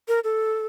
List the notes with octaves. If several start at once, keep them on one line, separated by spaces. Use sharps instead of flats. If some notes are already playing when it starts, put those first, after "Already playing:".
A#4
A4